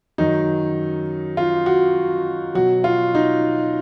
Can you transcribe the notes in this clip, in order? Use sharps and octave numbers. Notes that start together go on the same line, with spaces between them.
F#2 D#3 F#3 D#4
F4
F#4
B2 F#3 F#4
F4
D#4